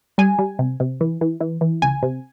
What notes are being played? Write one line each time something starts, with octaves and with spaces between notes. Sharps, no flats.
G3 G#5
G3
C3
C3
E3
E3
E3
E3
C#2 G#5
C3